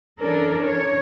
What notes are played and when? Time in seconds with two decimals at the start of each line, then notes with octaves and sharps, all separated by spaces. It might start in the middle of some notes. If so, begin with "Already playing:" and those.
0.21 E3 C#4 D4 A4 A#4
0.63 C#5